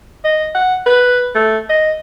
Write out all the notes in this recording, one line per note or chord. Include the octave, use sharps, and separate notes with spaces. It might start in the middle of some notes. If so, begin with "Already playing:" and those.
D#5
F#5
B4
A3
D#5